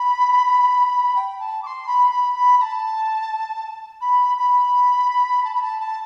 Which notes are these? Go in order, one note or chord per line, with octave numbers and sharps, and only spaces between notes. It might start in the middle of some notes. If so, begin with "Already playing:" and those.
Already playing: B5
G5
A5
D6
C6
B5
B5
B5
B5
A5
B5
B5
A5
B5
A5
A5